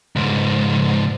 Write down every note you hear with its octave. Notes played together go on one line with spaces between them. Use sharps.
C#2 G#2